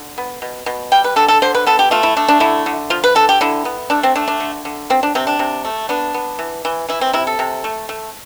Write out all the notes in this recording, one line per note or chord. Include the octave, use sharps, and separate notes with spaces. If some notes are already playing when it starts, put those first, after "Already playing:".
Already playing: D3
B3
B2
B2
G3 G5
B4
D3 A4
A4
D3 C5
B4
B3 A4
G4
A3 F4
E4
A3 D4
D4
D3 E4
D3
F3 F4
B4
D3 A4
G4
D3 E4
B3
A3 D4
C4
A3 D4
D4
D3
D3
F3 C4
D4
C3 C4
D4
C3
A3
B3 D4
B3
E3
E3
E3 E4
C4
C3 E4
A4
C3
A3
A3